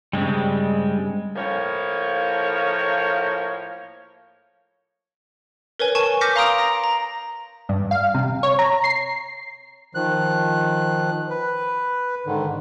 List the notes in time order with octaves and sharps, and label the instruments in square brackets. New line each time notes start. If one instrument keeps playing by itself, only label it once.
[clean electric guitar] G2 C#3 [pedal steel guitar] G3 G#3 C4
[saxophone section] A2 F3 A#3 C#5
[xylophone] A#4 B4 C#5 G#5
G#5 A5 C#6
D6 F6 G6 A#6 B6 C#7
F5 A#5 C6 D#6 D7 F7
A#5 A#6 D7
A#5
[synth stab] G2
F5
C3
C#5
A#5
C7
[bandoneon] D#3 F3 F#6
B4
G#2 D3 D#3